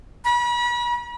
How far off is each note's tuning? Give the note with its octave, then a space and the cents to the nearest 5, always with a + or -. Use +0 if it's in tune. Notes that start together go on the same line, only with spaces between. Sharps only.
B5 -40